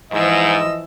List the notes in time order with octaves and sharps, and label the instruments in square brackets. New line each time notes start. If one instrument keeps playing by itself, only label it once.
[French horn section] G#2 [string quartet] E3 F3 E6 [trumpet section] D#5